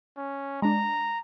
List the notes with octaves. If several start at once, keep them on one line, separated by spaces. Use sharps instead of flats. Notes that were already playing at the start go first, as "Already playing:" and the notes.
C#4
G#3 D4 A#5